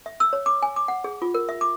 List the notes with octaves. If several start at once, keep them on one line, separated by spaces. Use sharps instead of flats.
E5
E6
C#5
D6
G#5
D6
F#5
G#4
F4
A#4
E5
D6